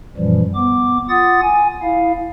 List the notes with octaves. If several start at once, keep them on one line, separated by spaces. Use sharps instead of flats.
F#2 A#2 E3 F3 G3
B3 D6
F4 F#5 D#6 A6
G#5
E4 F5